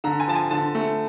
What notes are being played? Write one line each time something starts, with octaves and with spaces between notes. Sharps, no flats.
D3 A#5
G#5
F3 A5
G#5
D3 A5
A3